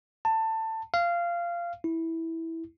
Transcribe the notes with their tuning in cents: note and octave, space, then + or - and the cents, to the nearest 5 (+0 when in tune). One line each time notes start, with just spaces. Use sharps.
A5 +20
F5 -15
E4 -10